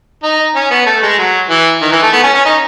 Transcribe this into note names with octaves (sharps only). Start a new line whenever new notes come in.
D#4
C#4
B3
A3
G#3
F#3
E3
D#3
E3
A3
B3
C#4
C#4
D#4